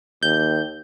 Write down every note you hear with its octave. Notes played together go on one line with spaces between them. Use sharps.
D#2 G6